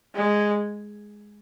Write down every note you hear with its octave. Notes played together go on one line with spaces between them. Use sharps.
G#3